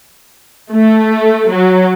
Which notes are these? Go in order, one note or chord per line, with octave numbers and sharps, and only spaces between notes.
A3
F#3